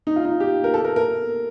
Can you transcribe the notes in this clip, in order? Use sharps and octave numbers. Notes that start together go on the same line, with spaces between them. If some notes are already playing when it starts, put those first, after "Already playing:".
D#4
F4
D#4
G4
A#4
A4
A#4
A#4